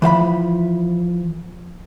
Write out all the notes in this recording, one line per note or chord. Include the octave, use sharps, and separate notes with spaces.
E3 F3 F5 B5